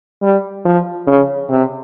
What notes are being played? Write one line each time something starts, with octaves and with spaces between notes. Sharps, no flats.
G3
F3
C#3
C3